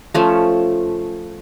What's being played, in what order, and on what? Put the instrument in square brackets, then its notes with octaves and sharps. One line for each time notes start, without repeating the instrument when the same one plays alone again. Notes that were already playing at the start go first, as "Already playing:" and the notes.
[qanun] F3 A3 C#4